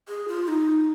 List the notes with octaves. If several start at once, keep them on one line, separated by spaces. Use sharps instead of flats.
G#4
F4
D#4